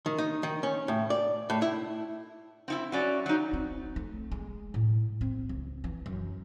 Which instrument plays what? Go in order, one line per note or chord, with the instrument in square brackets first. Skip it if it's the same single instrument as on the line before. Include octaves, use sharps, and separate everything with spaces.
[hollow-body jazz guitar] D#3
D#4
D#3
C#4
A2
D5
A2
E4
[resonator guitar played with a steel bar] C4 D#4 E4
F#3 C#4 D5
F#3 D#4
[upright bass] C4
A3
G#3
A2
C4
C#2
E3
F#2